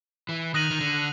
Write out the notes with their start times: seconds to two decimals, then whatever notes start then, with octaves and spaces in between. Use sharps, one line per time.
0.29 E3
0.54 D#3 D#6 F#6 A#6 D#7 F#7
0.70 D#3
0.80 D3